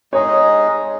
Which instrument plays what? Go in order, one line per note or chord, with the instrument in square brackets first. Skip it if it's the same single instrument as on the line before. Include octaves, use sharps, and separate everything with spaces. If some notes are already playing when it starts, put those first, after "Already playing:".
[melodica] G#3 D#4 G#4 D#5 [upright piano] C#5